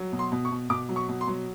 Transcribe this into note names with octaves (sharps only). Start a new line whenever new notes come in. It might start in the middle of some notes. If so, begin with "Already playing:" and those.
Already playing: F#3
B2
C6
B2
C#6
B2
B2 D6
F#3
C#6
B2
C6
F#3